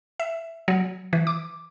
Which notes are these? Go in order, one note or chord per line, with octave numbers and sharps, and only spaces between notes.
E5
F#3
E3
D6